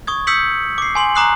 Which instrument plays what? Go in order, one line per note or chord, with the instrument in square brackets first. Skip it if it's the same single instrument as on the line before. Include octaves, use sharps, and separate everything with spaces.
[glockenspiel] C#6 D#6 G#6
D#6 E6 G6 B6 C#7 F#7
D6 C7
G#5 C6 F#7
A#5 D6 D#6 F#6 C7 F#7